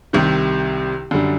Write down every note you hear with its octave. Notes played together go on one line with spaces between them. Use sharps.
C2 C3 D#3
F#2 D3 G3